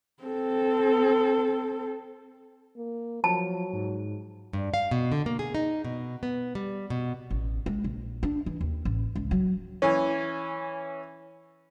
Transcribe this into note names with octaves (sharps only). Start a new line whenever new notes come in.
C4 A4
A#3
F3 F#3 A5
G#2
G2
F5
B2
D3
A#3
G#4
D#4
B2
B3
G3
B2
A1
G#3
A#1
D4
E3
D#2
A1
C#2
F#3
E3 C#4